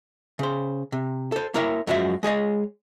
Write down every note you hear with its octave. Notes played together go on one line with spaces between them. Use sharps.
C#3 C5
C3
A4 C5
A#3 E4 A#4 C#5 E5
F#2 F3 F#3 G#3 F#4 E5
G#3 G#4 C#5 D#5